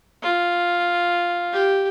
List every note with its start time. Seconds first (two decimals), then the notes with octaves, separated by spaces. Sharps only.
0.23 F4
1.52 G4